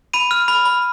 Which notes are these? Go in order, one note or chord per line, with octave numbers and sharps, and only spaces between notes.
B5 D#7
F6
B5
B5